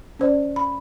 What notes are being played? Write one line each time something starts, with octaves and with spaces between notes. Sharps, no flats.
C#4 C5 D5
B5